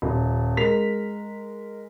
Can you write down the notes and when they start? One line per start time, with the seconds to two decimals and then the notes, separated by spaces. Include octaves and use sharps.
0.02 D#1
0.57 G#3 A#4 B6 F7